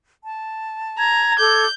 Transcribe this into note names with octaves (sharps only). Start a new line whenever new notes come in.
A5
A#5 G#6
A4 D6 G6